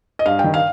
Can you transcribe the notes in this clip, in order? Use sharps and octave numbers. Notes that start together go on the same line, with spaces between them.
D#5
G2 F5
G5
D#3
F5